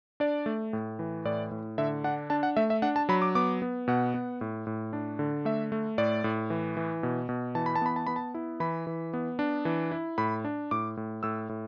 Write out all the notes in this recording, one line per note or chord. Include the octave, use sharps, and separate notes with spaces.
D4 D5
A3
A2
E3
A2 D5
A2
D3 E5
D4 F#5
D4 A5
F#5
A3 E5
E5
D4 F#5
A5
F#3 B5
D6
B3 D6
B3
B2 F#5
B3
A2
A2
D4
D3
A3 E5
A3
A2 D5
A2
E3
E3
B2
B2
E3 A5
B5
A5
B3 B5
A5
B3 B5
A5
E4
E3 B5
E3
B3
D4
E3
E4
A2 B5
D4
A2 D6
A2
A2 E6
A2